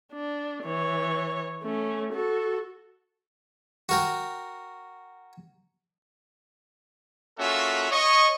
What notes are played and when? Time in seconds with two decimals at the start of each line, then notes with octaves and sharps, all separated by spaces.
0.13 D4
0.64 E3 C#5
1.63 A3 C#4
2.13 F#4 A4
3.89 F#4 A#4 G5
7.38 A#3 C#4 F4 F#4 A4 E5
7.91 C#5 D#5 C#6